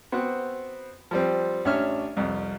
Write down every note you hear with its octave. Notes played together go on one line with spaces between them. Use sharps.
B3 C4 F#4 C5 F#5
F3 G3 C4
A1 C#4 D4 C#5 E5 F6
C2 F2